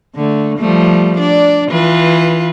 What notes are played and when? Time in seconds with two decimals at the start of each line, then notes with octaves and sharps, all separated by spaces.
0.16 D3 A3
0.58 F3 G3 A3
1.19 D4 D5
1.69 E3 F4 B4